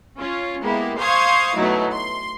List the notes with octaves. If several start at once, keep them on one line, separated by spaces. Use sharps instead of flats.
C#4 F4
G#3 A#3 B3 E4 G4
C5 F5 C6 C#6 D#6 G#6
B2 F#3 A3 D#4 E4
C6